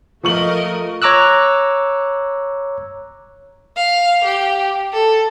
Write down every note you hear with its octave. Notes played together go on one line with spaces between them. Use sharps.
F3 A3 A#4 D#5 C#6 F#7
C#5 A#5 D6 E6 F#6
F5
G4
A4